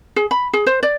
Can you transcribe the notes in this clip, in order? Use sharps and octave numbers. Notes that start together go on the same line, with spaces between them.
G#4
B5
G#4
C5
D5